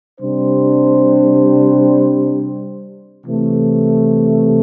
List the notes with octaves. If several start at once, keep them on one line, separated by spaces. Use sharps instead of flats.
C3 G3 D4 C5
C3 E3 A3